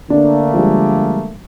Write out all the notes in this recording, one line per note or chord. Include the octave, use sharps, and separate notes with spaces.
D3 A3 A#3 D4
F3 G3 G#3